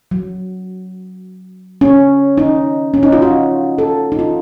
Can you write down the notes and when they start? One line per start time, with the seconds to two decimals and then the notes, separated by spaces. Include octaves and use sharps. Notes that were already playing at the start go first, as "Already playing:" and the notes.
0.11 F#3
1.81 C#4
2.38 D#4
2.94 C#4
3.03 D#4
3.12 F4
3.22 F#4
3.78 A4
4.12 D#4
4.19 F4